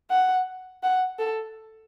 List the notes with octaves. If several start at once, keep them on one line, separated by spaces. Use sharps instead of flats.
F#5
F#5
A4